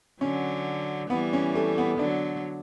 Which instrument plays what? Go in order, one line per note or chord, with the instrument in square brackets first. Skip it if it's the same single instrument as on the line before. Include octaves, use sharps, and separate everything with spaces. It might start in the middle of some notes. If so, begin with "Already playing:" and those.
[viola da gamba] D3 F#3 [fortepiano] C#4
[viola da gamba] E3 G3 [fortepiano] B3
[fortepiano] C#4
A3
B3
[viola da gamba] D3 F#3 [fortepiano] D4